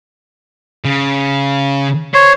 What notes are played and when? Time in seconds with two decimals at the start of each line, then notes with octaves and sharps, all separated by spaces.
0.85 C#3
2.14 C5 C#5